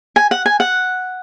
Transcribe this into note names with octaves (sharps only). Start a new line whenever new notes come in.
G#5
F#5
G#5
F#5